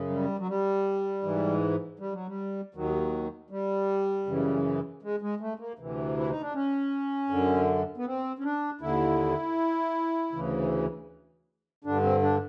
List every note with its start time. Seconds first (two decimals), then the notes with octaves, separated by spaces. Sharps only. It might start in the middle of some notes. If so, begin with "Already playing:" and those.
Already playing: F#2 C#3
0.10 G3
0.39 F#3
0.48 G3
1.23 G#2 E3
1.99 G3
2.13 F#3
2.27 G3
2.74 D#2 D#3 F#3
3.50 G3
4.27 F#2 C#3 E3
5.03 G#3
5.22 G#3
5.40 A3
5.59 A#3
5.78 D2 C3 E3
6.17 E4
6.29 D#4
6.41 D4
6.54 C#4
7.30 F#2 D3
7.97 B3
8.06 C4
8.39 C#4
8.44 D4
8.81 D#2 D3 E4
10.33 D2 C#3 E3
11.84 G2 D3 D4
12.03 C4
12.22 D4